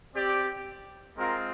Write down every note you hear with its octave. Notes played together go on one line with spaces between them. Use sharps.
C4 G4 D5
G#3 C4 F4 A#4